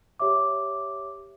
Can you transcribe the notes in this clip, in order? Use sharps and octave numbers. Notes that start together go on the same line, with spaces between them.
G4 C#5 E5 D6